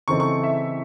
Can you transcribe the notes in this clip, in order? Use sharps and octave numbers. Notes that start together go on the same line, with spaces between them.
C#3 E3 C4 D#4 A4 C#6
C#6
E5